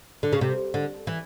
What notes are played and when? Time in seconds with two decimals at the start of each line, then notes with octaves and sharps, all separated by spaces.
0.23 D3
0.32 C#3
0.41 C3
0.74 D3
1.07 E3